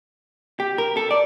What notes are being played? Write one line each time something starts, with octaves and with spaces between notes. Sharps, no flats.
G4
A#4
A4
D5